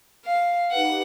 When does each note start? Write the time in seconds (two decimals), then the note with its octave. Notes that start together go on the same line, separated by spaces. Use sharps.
0.25 F5
0.72 D#4 G4 B4 F#5